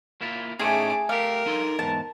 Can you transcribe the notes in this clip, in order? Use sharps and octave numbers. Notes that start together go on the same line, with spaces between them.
A#3 E4 F4
A2 A3 C#4 D#4 G#4 D6
A3 G4 A#4 F5
D#4 A4 C6
E2 G#2 A5